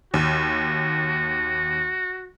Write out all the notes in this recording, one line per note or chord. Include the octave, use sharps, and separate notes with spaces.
D#2 F#4